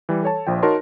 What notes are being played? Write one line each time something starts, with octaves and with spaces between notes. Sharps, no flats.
E3 G3
A4 C#5 A5
A#1 F3 G5
D#4 F#4 A#4 C#5 A5 C6